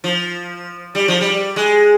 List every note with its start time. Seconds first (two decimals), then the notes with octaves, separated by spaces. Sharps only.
0.04 F3
0.95 G3
1.08 F3
1.21 G3
1.56 G#3